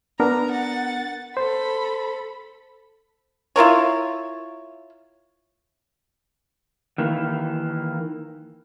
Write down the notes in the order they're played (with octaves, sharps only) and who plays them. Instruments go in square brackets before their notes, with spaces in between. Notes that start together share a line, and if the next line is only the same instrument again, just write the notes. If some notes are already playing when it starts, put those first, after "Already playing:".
[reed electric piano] B3 D4 A#4 [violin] A#5
[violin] F#5 A6
[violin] A4 B5 [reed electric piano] C5
[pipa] E4 F4 A#4 C#5
[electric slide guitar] D#3 E3 A#3